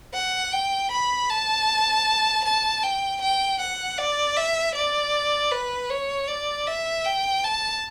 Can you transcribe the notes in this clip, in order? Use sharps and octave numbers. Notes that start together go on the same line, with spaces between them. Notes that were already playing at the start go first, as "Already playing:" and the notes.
F#5
G5
B5
A5
A5
G5
G5
F#5
D5
E5
D5
B4
C#5
D5
E5
G5
A5